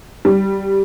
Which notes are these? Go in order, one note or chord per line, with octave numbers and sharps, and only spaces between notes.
G3